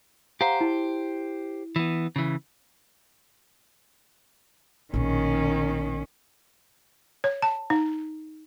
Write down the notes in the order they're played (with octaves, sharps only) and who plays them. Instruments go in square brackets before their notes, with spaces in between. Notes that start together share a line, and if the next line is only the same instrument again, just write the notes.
[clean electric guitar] G4 C5 [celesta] F5 F#5 A#5
[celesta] E4
[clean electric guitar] E3 B3
C#3 E3
[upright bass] A#1 B2 [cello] D#3 C#4
[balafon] C#5
A5
D#4